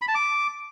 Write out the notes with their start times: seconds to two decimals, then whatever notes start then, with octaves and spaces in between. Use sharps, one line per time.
0.02 B5
0.08 A5
0.15 D6